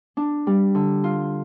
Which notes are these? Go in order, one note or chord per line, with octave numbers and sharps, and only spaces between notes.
D4
G3
D3
F4